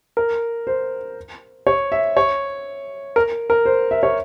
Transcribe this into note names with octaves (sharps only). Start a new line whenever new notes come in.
A#4
C5
C#5
E5
C#5
A#4
A#4
C5
E5
C#5